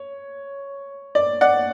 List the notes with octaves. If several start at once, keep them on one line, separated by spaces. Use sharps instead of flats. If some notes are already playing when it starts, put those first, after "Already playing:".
Already playing: C#5
D5
D5 F#5